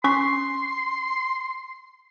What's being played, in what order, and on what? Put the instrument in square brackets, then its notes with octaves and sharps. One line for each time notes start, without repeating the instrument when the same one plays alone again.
[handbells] C#4 C#6 B6 [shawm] C6